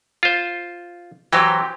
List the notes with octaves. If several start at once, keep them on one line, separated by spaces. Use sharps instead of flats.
F4 C5
E3 F#3 C4 G4 G5